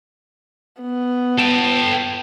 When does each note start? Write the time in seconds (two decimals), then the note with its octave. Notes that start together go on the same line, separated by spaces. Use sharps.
0.81 B3
1.38 A4 G5